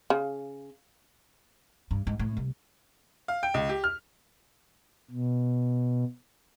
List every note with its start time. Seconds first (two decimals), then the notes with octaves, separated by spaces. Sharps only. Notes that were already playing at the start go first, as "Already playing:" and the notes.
0.10 C#3
1.91 G2
2.07 G#2
2.19 A2
2.37 C2
3.28 F5
3.43 G5
3.54 C#2
3.69 G4
3.84 F6
5.10 B2